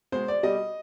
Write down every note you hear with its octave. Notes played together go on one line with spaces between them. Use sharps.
B2 G#3 C5
D5
B2 G3 D#5